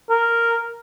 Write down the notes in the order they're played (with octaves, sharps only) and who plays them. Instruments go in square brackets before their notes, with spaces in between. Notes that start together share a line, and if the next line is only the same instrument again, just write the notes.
[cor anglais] A#4